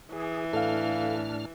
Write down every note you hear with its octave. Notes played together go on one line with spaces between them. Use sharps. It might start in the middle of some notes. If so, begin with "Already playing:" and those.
E3 G#4
A2 D4 A4 F5 F6